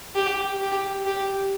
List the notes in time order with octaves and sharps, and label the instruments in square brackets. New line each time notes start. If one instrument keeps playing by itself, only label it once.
[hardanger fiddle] G4
G4
G4